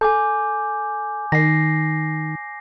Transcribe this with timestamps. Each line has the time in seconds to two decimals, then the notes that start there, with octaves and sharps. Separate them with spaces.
0.01 A4 G#5 D6 G6
1.32 D#3 A#6 C7